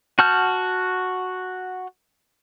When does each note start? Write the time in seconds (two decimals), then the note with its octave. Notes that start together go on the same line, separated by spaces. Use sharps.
0.19 F#4 F#5 A5 F6 G6